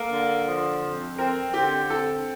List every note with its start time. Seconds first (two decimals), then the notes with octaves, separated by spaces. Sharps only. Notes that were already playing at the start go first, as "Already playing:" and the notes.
Already playing: A#3 A4
0.09 D3
0.46 F3
0.82 F2
1.18 C4 A#4
1.54 D3 G4
1.90 C4 A4